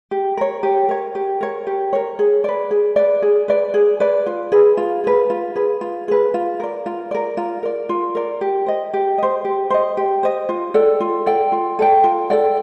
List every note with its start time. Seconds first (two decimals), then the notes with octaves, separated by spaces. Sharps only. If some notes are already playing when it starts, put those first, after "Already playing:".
0.11 G4
0.37 A#4 C#5
0.63 G4
0.89 A#4 C#5
1.15 G4
1.41 A#4 C#5
1.67 G4
1.93 A#4 C#5
2.19 G#4
2.44 B4 D5
2.71 G#4
2.96 B4 D5
3.22 G#4
3.48 B4 D5
3.74 G#4
4.00 B4 D5
4.26 F4
4.52 G#4 B4
4.77 F4
5.04 G#4 B4
5.30 F4
5.56 G#4 B4
5.81 F4
6.08 G#4 B4
6.34 F4
6.60 A#4 D5
6.86 F4
7.11 A#4 D5
7.37 F4
7.63 A#4 D5
7.89 F4
8.15 A#4 D5
8.41 G4
8.66 C5 D#5
8.94 G4
9.18 C5 D#5
9.45 G4
9.70 C5 D#5
9.97 G4
10.23 C5 D#5
10.49 F4
10.74 A4 D5 G5
11.00 F4
11.26 A4 D5 G5
11.52 F4
11.79 A4 D5 G5
12.04 F4
12.30 A4 D5 G5